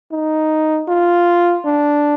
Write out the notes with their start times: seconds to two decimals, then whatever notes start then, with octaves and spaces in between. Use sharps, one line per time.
0.12 D#4
0.88 F4
1.65 D4